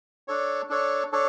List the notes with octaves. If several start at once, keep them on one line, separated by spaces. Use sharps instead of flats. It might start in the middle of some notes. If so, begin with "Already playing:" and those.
D4 A4 C#5
D4 A4 C#5
D4 A4 C#5